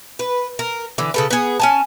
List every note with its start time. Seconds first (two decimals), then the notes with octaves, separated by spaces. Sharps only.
0.19 B4
0.59 A#4
0.98 D3 E3
1.14 C#3 A4 B4
1.31 B3 G#4
1.60 C#4 G#5 A5